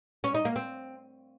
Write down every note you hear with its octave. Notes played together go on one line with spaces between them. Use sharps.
C#4
D#4
A#3
C4